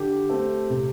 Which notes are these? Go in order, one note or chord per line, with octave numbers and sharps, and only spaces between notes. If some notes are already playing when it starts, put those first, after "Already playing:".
Already playing: D3 G4
A3 C4
C3